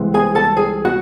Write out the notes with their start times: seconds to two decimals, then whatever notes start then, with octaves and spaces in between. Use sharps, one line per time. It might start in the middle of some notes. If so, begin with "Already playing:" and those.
Already playing: C2 C3 E3 G#3
0.14 G#4 G#5
0.35 A4 A5
0.57 G#4 G#5
0.85 F#4 F#5